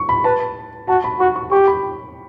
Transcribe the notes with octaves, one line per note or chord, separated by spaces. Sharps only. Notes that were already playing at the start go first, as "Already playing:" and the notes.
Already playing: C#6
B5
B4 A5
F#4 A5
B5
F#4 C#6
C#6
G4 C#6
B5